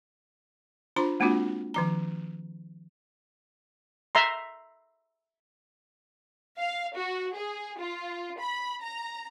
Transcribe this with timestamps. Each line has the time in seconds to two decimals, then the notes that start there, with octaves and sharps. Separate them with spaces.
0.96 D4 F4 C5 A#5 C6
1.20 G#3 A#3 C4 D4 F4 F#4
1.74 D#3 F3 A#5
4.15 E5 A#5 C6
6.58 F5
6.96 F#4
7.36 G#4
7.79 F4
8.39 B5
8.82 A#5